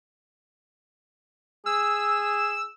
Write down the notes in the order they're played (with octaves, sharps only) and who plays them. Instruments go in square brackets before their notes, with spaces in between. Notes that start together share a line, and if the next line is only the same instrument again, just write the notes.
[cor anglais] G#4 [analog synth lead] E6